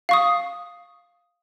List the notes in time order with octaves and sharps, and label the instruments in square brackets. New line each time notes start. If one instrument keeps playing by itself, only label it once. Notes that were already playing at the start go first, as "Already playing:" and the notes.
[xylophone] F5 C#6 D#6